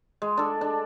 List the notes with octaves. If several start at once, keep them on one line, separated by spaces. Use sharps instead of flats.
G#3
D4 A4
D4